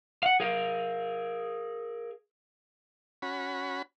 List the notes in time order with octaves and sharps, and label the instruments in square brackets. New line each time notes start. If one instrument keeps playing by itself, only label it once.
[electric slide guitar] F5 F#5
G#4 A#4 F5
[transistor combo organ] C#4 F#4 B5